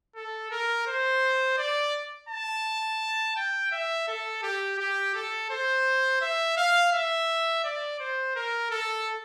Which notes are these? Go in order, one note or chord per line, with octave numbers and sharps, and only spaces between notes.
A4
A#4
C5
D5
A5
G5
E5
A4
G4
G4
A4
C5
E5
F5
E5
D5
C5
A#4
A4